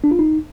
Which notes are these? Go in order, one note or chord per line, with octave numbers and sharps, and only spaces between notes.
D4
F4
D#4